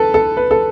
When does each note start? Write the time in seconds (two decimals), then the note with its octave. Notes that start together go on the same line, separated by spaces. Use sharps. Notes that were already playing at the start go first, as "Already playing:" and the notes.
Already playing: A4 B4
0.14 A4
0.37 B4
0.51 A4